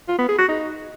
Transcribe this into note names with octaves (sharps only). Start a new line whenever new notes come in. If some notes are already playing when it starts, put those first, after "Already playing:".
F4
B3
G#4
F#4
D#4